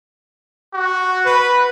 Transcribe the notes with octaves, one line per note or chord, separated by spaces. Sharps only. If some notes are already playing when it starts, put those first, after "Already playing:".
F#4
B4